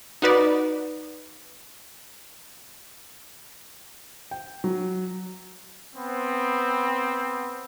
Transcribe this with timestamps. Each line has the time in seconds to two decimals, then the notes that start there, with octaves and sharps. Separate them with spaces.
0.22 D#4 F#4 B4 D5
4.31 G5
4.64 F#3
5.95 B3 C4